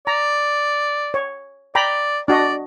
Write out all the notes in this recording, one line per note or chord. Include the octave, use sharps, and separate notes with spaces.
D5 A#5
C#5
D5 G5 A#5 B5
D4 F#4 D5 D#5